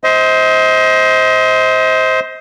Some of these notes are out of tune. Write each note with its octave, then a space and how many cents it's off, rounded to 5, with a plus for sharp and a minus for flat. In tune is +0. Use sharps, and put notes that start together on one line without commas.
C5 +0 D#5 +35